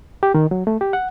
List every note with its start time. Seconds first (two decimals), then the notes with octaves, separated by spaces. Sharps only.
0.23 G4
0.35 D#3
0.51 F#3
0.67 A3
0.81 G4
0.93 F#5